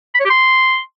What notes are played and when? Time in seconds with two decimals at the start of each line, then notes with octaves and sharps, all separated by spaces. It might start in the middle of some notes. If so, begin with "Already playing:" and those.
0.15 B5
0.20 C#5
0.25 G4
0.30 C6